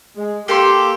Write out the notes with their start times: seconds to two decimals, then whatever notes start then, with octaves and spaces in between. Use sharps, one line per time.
0.16 G#3
0.48 A#3 G4 A4 C6